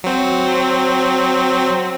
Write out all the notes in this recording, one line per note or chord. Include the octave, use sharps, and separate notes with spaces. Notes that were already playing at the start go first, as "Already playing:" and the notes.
F#3 C4